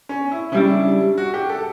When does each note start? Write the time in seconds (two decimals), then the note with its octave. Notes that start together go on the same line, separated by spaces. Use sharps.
0.09 C#4
0.32 E4
0.52 C#3 G3 D4 E4
1.18 F#4
1.34 G4
1.49 A4